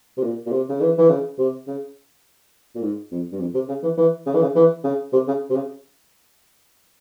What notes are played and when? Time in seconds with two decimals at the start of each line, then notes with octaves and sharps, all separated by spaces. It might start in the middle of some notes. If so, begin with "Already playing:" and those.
0.17 C3
0.23 A#2
0.46 A#2
0.52 C3
0.69 C#3
0.81 E3
0.98 E3
1.09 C#3
1.38 C3
1.67 C#3
2.75 A#2
2.82 G#2
3.11 F2
3.32 G2
3.40 F2
3.54 C3
3.69 C#3
3.83 E3
3.97 E3
4.26 C#3
4.34 E3
4.42 C#3
4.55 E3
4.84 C#3
5.13 C3
5.28 C#3
5.50 C3
5.56 C#3